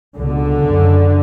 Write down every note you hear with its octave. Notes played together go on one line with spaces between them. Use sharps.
C#2 B2 D3
F#2 C#3